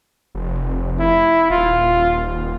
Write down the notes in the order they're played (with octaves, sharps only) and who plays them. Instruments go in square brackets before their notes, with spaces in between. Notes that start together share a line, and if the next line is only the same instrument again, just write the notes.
[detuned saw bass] F1
[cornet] E4
[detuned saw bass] D#1 [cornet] F4